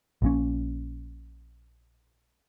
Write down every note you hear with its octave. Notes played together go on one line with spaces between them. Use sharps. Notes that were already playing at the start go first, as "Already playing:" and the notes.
A#1 A#2 C#4